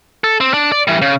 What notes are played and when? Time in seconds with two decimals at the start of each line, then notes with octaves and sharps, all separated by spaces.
0.24 A4
0.40 C4
0.54 D4
0.72 D5
0.87 E3 G3
1.02 C#3